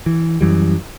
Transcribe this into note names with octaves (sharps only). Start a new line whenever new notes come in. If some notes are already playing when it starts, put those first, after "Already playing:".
E3
F#2 E3 G3